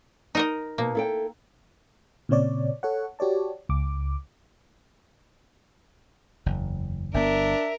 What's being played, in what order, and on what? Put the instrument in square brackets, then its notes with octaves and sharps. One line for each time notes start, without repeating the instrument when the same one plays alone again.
[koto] D#4 A#4 D#5
[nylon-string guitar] B2 [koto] A#3
[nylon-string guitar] E4 A4 G5
[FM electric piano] A#2 C#3 C4 C#5 D5
A4 C#5 F#5
F#4 G4 C#5 D5 A5
C#2 D6
[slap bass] F#1 E2
[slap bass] G1 B3 [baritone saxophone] D4 [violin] A#4 [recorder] E5